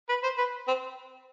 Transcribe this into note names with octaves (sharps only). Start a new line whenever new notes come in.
B4
C5
B4
C4